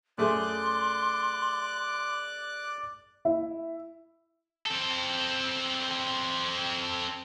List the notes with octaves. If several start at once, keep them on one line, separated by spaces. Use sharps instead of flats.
F#2 A3 G#4 D5 C6 D6 F#6
E4
C4 A4